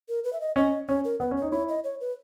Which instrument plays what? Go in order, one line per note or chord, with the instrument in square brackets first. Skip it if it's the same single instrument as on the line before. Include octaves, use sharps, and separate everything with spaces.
[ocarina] A#4
B4
E5
D#5
[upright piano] C#4 [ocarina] D#5
[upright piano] C#4 [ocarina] C#5
[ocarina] A#4
[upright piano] B3 [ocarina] B4
[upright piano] C#4
[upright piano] D#4 [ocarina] C#5
[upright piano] E4 [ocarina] C#5
[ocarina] D#5
C#5
B4